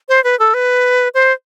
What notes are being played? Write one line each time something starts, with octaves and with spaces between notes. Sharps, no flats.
C5
B4
A4
B4
C5